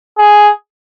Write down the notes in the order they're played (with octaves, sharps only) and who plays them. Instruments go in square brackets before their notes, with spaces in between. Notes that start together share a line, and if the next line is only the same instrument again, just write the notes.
[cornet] G#4